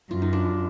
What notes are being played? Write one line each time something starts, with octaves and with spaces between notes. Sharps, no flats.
F#2 F4
D#4
D4 F4